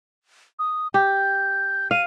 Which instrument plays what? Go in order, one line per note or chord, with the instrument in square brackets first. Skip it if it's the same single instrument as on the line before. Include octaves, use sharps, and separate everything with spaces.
[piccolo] D#6
[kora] G4 [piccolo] G6
[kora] F5 [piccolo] D#7